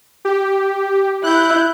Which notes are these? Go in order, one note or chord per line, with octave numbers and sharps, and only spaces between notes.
G4
E4 F#6 G6